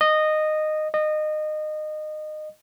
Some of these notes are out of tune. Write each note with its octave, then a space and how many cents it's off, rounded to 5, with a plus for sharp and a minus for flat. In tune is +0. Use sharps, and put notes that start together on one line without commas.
D#5 -15
D#5 -25